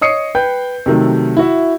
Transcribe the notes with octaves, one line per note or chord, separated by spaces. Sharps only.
C#5 D#5 D#6 C7 C#7
B4 G5 G6
C3 D#3 F#3 A3
E4 F#4 E5